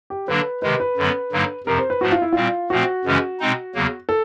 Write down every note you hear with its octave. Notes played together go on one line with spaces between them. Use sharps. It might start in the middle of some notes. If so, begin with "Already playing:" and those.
G4
D3 F#3 A#3 D4 B4
C3 D#3 G#3 B4
B4
F#2 D3 F#3 B3
G2 D3 F#3 A#3 D#4
F2 C3 F3 A#4
C5
B4
G#2 F3 A3 D4 F#4
F4
E4
A#2 G3 C4 F4
A#2 F3 A3 C4 F#4
F#2 C#3 E3 G#3 C#4
B2 G#3 C4 D#4
E2 C#3 F#3 A#3
A4